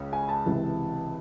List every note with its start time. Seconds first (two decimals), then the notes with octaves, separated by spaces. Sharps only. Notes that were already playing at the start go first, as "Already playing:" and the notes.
Already playing: C#2 C#3
0.13 G#5
0.29 A5
0.46 C#2 C3 E3